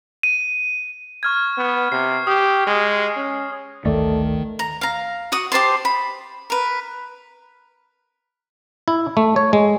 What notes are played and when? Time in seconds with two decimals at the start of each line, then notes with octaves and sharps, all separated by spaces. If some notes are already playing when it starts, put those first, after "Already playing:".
0.23 D#7
1.23 C#6 F6 G#6
1.57 B3
1.92 C3 C7
2.27 G4 D#6
2.67 G#3
3.16 C#4
3.86 G#1 D2 D#3 A3 A4 D5
4.59 A#5
4.81 F5 A#5
5.32 F#4 F#5 D#6
5.52 G4 C5 A5 C6
5.85 B5
6.50 A#4 B4
8.88 E4
9.17 A3
9.36 C#5
9.53 G#3